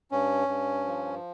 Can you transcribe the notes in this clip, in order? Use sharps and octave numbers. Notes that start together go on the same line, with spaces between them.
G2 C#4
G2
F3